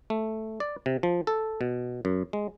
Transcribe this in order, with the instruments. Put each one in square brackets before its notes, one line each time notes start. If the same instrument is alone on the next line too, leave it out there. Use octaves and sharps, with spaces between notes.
[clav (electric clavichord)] A3
D5
C3
F3
A4
B2
F#2
G#3